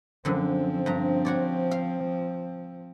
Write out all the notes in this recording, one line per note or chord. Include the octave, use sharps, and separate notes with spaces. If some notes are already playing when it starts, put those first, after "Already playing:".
F#2 D3 F3 C4
G2 A#5
F#4 C#5 D5
F5